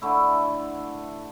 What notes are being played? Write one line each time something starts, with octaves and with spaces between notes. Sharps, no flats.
D3 A3 E4